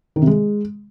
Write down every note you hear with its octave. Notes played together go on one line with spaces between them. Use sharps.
D#3
C3
G#3